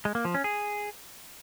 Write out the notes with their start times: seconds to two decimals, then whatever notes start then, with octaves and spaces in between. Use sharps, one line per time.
0.05 G#3
0.15 A#3
0.25 F3
0.35 C#4
0.44 G#4